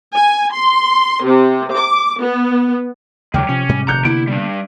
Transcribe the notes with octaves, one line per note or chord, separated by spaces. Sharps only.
G#5
C6
C3
D6
B3
D#2 C#3 F#3 G#3 G5 D6 F6
C3 F3 C#4
G#2 G3 G#3
F1 A#2 D#3 A#5 F#6 G6 C#7
D3 A#3 B3 E4 D7
G3 D4